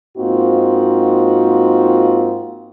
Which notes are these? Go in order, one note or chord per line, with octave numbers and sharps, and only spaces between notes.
G#2 A#3 C4 D#4 F4 F#4